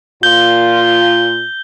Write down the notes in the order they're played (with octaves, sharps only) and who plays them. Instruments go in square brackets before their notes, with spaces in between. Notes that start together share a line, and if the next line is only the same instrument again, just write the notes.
[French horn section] A#2 F4 [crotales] G6 G7